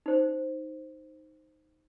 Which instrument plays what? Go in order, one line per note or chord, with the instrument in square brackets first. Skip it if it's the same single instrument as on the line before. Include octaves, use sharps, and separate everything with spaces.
[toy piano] D#4 C5